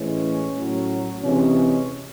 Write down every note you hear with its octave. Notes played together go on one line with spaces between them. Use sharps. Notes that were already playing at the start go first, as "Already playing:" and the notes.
Already playing: A2 E3 G#3 C#4
A2 F#3
C3 E3 G#3 C#4